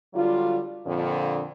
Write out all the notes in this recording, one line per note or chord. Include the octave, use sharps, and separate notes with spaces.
D3 F#3 G3 F4
F2 A#2 D3